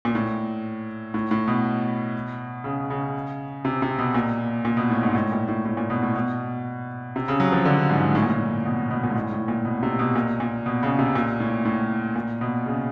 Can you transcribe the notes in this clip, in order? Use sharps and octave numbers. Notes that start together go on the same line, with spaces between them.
A#2
A2
A2
A2
B2
C#3
C#3
C3
C3
B2
A#2
A#2
B2
A2
G#2
A2
A#2
A2
A2
A#2
B2
A2
B2
C3
C#3
F#3
F3
D3
G#2
A2
A#2
A2
B2
B2
A#2
G#2
A2
A2
A#2
B2
C3
B2
A#2
A#2
B2
C#3
C3
A#2
A2
A2
A#2
B2
C#3